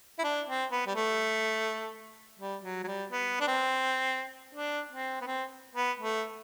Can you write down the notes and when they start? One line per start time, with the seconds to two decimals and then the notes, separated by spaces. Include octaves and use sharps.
0.19 E4
0.24 D4
0.48 C4
0.71 B3
0.87 G3
0.95 A3
2.39 G3
2.63 F#3
2.84 F#3
2.87 G3
3.11 B3
3.40 D4
3.48 C4
4.55 D4
4.91 C4
5.21 B3
5.27 C4
5.75 B3
5.98 A3